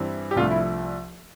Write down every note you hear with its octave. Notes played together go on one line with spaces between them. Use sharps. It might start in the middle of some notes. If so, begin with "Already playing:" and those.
Already playing: G2 E3 G3 C4
G4
C2 C3 F3 A3 D4 F4
E4